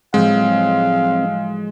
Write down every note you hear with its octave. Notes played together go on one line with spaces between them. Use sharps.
A2 F3 F#3 G#3 C4 F5